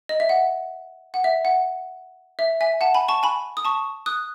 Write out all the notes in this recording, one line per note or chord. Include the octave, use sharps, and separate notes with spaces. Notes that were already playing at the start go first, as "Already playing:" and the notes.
D#5
E5
F#5
F#5
E5
F#5
E5
E5 G#5
F#5 A5
G#5 B5
A5 C#6
G#5 B5
D#6
A5 C#6
D#6 F#6